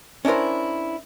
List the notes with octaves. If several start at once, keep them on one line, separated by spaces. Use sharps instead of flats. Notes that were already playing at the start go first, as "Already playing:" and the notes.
C#4 D4 E4 A#4 C5